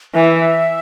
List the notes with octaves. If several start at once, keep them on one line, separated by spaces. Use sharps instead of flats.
E3 E5